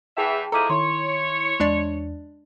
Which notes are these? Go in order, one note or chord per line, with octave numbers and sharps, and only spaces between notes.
E2 E3 G#4 E5 G5 A5
F3 G#3 E4 A4 A#5 D6 D#7
D#3 E4 C#5 C6
E2 G#3 D4 D5